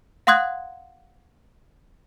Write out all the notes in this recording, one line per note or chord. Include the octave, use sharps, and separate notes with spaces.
F5 F#5 C6 D#6 F#6 G#6